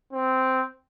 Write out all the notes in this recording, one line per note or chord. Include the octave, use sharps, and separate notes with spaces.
C4